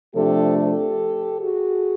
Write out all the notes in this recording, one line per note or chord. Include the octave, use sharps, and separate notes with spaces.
C3 F3 A3 D4 G4 A4
G4 A4
F#4 G#4